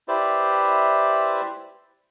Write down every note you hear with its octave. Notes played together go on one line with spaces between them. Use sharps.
E4 G4 B4 C5 D5 E5